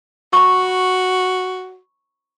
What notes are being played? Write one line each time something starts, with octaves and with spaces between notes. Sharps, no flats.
F#4 B5 C#6